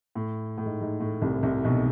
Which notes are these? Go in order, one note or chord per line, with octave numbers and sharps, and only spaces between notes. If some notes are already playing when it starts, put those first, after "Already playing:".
A2
A2
G#2
G#2
A2
C2 C3
C2 C3
B1 B2